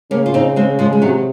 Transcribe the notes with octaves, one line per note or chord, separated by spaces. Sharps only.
C#3 A#3 C#4
F4
C4 D#4
G#3 C4
F3 G#3
G#3
C3 D#3 F#3